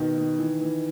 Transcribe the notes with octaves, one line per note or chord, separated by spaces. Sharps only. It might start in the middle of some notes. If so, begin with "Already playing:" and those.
Already playing: B2 D#3
D#3
E3
E3